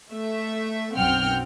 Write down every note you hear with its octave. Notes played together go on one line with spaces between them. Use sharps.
A3 E5
B1 F#2 C4 F#5 G5 F6